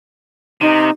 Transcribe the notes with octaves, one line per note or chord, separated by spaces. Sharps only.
C3 D#4